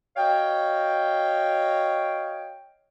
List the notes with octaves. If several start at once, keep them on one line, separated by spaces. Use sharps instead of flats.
F#4 C#5 D#5 F5 G5